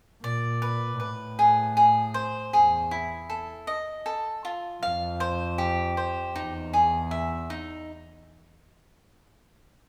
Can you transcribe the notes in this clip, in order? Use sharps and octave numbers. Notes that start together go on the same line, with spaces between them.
A#2 D5
B4
A2 B4
G#4
G#4
C5
E2 G#4
E4
A4
D#5
A4
F4
F2 F5
C5
G4
C5
E2 D#4
G#4
E5
D#4